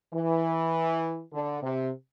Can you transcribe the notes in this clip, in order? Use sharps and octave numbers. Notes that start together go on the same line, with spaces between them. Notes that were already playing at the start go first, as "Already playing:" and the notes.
E3
D3
C3